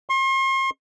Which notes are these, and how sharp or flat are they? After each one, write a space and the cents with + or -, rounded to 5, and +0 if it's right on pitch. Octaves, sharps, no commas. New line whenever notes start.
C6 +40